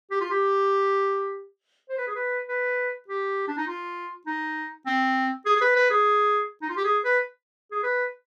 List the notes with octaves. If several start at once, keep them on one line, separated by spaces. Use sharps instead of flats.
G4
F4
G4
C5
B4
G#4
B4
B4
G4
D4
D#4
F4
D#4
C4
G#4
G#4
B4
B4
G#4
D#4
F4
G4
G#4
B4
G#4
B4